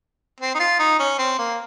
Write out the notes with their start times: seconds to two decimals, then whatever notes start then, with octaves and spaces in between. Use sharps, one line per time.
0.40 C4
0.55 D#4
0.60 F4
0.79 D#4
0.99 C#4
1.18 C4
1.39 A#3